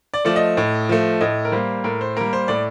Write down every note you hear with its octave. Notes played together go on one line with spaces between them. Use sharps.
D5
F3 A3 D5
D#5
A2
F3 A3
A2 D#5
A#4
G3 A#3 C5
A2 A#4
C5
G3 A#3 A#4
C5
A2 D5